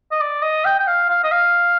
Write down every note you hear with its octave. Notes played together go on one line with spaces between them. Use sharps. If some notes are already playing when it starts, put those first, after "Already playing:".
D#5
D5
D#5
G5
G5
F5
F5
D#5
F5